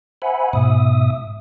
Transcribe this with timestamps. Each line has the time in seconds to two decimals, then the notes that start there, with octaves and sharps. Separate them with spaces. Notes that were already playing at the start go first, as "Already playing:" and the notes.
0.22 C5 E5 F#5 G#5 B5
0.53 G#2 B2 E5 D#6